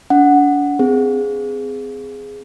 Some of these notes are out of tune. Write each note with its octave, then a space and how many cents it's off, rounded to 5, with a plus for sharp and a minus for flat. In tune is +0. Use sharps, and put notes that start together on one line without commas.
D4 -35 F#5 +0
C4 -30 G#4 +0